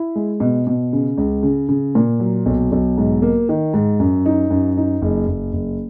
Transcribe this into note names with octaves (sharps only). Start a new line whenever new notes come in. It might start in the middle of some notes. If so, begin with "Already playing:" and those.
Already playing: E4
G#3
B2
B2
C#3
C#2
C#3
C#3
A#2
F#3
B1
B1
G#2
A#3
D#3
G#2
F#2
D#4
F#2
D#4
F#1
F#1
F#1